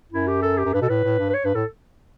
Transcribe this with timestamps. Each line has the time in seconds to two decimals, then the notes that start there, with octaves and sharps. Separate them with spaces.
0.12 F#2 E4
0.27 G4
0.42 A4
0.58 G4
0.65 F#2
0.74 G2 B4
0.81 B2 A4
0.89 A2 B4
1.04 A2
1.19 G2
1.29 B4
1.34 C#5
1.45 G2 B4
1.55 A2 A4